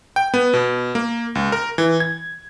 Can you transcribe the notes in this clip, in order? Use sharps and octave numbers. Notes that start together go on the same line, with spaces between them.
G5
B3
B2
A#3
C#2
A#4
E3
G#6